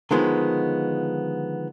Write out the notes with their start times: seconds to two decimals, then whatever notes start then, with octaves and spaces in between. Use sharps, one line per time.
0.11 D3 D#3 F3 G#3 B3